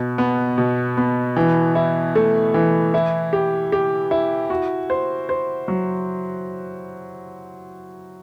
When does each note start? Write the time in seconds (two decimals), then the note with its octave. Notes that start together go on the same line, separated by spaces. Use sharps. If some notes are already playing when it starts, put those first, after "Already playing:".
Already playing: B2
0.18 B3
0.58 B2
0.97 B3
1.36 E3
1.75 E4
2.15 A3
2.54 E3
2.94 E4
3.33 G4
3.72 G4
4.11 E4
4.50 F#4
4.90 C5
5.29 C5
5.68 F#3